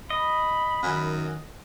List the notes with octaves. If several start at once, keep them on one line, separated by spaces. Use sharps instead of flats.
D#5 B5
F#2 D#3